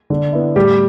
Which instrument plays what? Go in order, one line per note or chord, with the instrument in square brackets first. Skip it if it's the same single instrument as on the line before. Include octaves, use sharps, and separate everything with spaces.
[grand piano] D3
B3 E4
[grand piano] A2 [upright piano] G3 G4